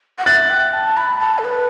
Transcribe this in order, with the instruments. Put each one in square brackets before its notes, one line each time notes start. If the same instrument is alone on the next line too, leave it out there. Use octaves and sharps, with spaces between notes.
[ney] F#5
[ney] E5 [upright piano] F#6 A6
[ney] G5
A5
B5
A5
A4
B4